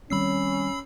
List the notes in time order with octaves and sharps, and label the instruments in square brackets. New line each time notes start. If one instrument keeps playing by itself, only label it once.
[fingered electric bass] D#3 G3 C4 [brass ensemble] C#4 [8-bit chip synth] B5 E6 C7